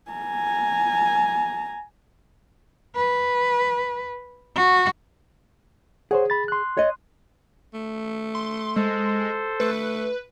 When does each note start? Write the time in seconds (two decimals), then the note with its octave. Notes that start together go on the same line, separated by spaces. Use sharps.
0.11 G#5 A#5
2.95 B4
4.55 F#4
6.11 G#4 C5 C#5 F#5
6.30 B5 A6
6.48 C6 F#6
6.77 C#5 D#5
7.73 A3
8.35 C6
8.76 G#3 A4 C5
9.60 A3 B4